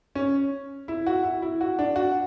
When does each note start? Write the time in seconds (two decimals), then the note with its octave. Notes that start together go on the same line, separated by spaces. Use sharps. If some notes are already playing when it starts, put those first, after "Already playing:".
0.15 C#4
0.88 E4
1.07 F#4
1.24 E4
1.42 E4
1.61 F#4
1.79 D4
1.96 F#4